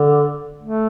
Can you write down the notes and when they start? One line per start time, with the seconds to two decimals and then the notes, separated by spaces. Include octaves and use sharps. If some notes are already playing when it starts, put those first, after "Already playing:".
Already playing: D3
0.63 A3